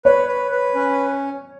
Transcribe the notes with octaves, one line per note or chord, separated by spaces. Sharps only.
B4 C#5
B4
B4
C#4